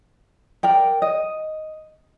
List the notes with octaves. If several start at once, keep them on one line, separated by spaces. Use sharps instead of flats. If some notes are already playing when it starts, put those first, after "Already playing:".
A#4 D5 G5
D#5